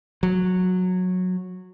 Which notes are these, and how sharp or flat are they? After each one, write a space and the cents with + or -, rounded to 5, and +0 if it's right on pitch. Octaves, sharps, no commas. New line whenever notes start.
F#3 -15